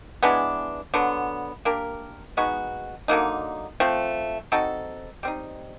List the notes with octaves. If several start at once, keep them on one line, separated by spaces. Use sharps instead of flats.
E3 G#3 B3 D4
D3 F#3 B3
A#3 D4 G4 A#4
G#3 B3 D#4 F#4
D3 F#3 A#3 D#4
F3 A3 C4
C4 D#4 F#4 A4
G3 C4 D#4